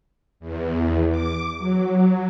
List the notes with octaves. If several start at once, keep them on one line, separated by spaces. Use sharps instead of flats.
E2
D6
F#3